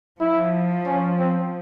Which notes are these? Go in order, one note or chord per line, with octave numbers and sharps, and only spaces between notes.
F3 E4
C#4
C4